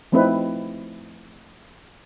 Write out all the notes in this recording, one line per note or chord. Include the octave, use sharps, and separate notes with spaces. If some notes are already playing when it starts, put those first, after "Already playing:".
F3 A3 C4 D#4 E4 B4